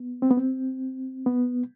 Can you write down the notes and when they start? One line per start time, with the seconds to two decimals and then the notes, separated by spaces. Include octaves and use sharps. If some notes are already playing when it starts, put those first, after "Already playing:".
Already playing: B3
0.22 C4
0.31 B3
0.37 C4
1.26 B3